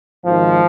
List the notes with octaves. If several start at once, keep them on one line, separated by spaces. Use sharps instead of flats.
G#1 G#2 D#3 F3